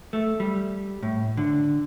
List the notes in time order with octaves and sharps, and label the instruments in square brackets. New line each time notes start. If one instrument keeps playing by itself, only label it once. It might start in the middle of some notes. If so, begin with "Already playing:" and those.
[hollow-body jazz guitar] A3
G3
A2
D3